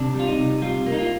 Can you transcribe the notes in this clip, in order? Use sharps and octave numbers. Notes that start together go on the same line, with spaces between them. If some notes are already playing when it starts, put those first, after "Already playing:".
Already playing: C3 D4
G3 F4
D#4
C3
G3 F4
A#3
D#4
F4